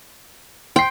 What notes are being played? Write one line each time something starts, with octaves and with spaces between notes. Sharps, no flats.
G5 C6 C7